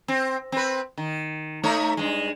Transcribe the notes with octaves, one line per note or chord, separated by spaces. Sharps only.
C4
C4 B4
D#3
A3 D#4 C#5
G2 G#3